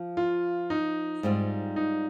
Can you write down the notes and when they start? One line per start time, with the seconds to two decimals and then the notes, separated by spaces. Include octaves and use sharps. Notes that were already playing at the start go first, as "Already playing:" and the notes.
Already playing: F3
0.17 F4
0.70 D#4
1.23 G#2 G3 C4 F4
1.76 D#4